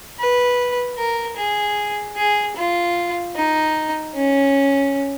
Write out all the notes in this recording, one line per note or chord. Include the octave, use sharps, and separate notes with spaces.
B4
A#4
G#4
G#4
F4
D#4
C#4